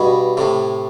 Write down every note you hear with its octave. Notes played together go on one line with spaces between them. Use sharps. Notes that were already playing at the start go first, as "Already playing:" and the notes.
Already playing: G2 B2
A2 C3